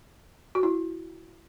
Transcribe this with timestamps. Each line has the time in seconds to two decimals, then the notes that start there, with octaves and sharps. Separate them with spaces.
0.55 F#4
0.63 E4